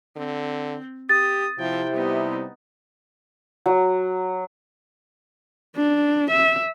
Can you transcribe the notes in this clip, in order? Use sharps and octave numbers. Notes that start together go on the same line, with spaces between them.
D3 C4
G4 D#6 A6
C3 F3 E4 G5
G3 B3 D#4
F#3
D4
E5